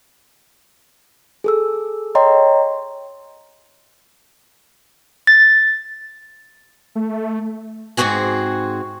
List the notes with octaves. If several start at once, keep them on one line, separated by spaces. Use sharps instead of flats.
G#4 A4 E6
C#5 D#5 G5 A#5 C6
A6
A3
G#2 B2 C4 F#4 G#4